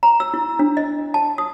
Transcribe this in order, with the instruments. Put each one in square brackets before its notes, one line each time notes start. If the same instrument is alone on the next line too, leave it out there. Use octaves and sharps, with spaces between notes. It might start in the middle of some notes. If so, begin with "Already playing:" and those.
[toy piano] A#5
E6
E4
D4
D#5
A5
D#6